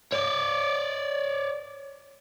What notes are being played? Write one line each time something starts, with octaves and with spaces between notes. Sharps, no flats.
C#5 D5